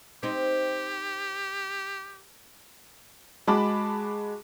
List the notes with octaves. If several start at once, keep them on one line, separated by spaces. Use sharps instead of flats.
C4 D#4 G4
G#3 F#4 A5 B5 D6